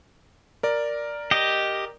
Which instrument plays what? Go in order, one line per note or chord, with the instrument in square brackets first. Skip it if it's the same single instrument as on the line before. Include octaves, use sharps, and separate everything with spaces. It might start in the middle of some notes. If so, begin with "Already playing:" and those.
[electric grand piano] A#4 D5
[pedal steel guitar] G4 D#5